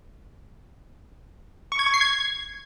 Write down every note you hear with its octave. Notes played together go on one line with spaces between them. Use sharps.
C#6
G#6
C#6
C7
G#6